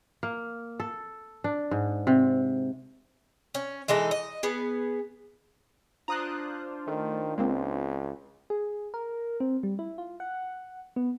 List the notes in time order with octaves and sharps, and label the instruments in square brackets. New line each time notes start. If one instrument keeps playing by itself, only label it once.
[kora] A#3
A4
D4
G#2
C3
[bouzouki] C#4
E3 G#3 D#4 A4
D#5
B3 G#4
[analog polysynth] D4 F4 C5 [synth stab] A#5 D#6 F#6
[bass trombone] D#3 [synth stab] A3
[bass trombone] C#2 [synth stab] G#3 A#3 C4
[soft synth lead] G#4
A#4
C4
G3
E4
F4
F#5
B3